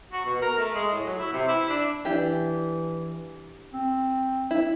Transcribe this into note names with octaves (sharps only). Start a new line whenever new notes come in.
F#4
B2
A#4
A3
G#3
A2
F#3
E4
C3
E4
D4
E3 D4 E4 G4
C4
E4